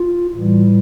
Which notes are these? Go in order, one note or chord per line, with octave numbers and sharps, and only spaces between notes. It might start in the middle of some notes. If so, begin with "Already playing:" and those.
Already playing: F4
A2 E3 G3